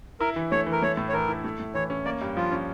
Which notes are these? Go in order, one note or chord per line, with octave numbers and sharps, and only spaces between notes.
E4 A#4
E3
A3 C#5
E3
A#4
A3 C#5
A2
C#5
E3 A#4
E4
A3
A2
E3 C#5
C#4
A#3 D5
G2
F3 F4
C#4